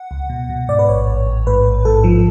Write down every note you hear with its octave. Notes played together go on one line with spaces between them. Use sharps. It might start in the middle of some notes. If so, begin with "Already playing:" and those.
Already playing: F#5
C#2
B2
B2
G#2 D5
B4
A1 C#5
A1
A1
G#2 B4
A1
G#2 A4
F3